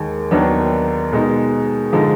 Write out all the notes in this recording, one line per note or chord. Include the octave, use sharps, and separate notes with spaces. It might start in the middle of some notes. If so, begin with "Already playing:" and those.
Already playing: D#2 D#3 G#3
D#2 D#3 F#3 B3 D4
B2 G#3 D#4
D3 F3 G#3 D#4